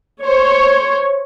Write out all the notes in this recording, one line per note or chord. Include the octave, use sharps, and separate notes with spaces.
C5 C#5